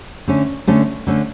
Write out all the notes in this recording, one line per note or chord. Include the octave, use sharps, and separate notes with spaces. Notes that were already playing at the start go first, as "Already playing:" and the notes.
D3 A3 C#4
D3 A3 C#4
D3 A3 C#4